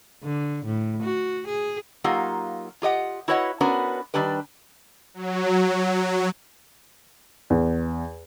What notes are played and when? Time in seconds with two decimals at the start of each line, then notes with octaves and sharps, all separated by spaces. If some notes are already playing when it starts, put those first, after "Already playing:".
0.23 D3
0.65 A2
1.03 F#4
1.47 G#4
2.04 F#3 A#3 D#4 F4 G4 F#5
2.82 F4 G4 D#5 F#5
3.28 E4 F#4 B4 C#5 D#5 F#5
3.61 B3 C#4 D4 F#4 A#4 B4
4.14 D#3 G3 D4 G4 B4
5.14 F#3
7.50 E2